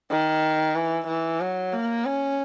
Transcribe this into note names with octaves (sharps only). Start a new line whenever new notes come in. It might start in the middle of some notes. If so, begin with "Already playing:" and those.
D#3
E3
E3
F#3
A#3
C#4